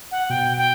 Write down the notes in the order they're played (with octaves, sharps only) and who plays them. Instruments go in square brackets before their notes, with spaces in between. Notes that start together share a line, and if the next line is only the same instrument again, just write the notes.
[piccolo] F#5
[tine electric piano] B2 [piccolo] G5
[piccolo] G5